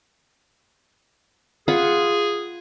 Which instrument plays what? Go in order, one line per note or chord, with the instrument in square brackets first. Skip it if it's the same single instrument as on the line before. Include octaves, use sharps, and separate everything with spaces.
[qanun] F4 F#5 B5 [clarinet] G#4